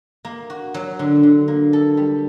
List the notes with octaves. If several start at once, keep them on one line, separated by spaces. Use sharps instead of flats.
A#3
F#4
F#3
D3
D3
A#3
A4
G3